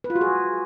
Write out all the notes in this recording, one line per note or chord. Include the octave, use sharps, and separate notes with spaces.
B4
F4
F#4
G#4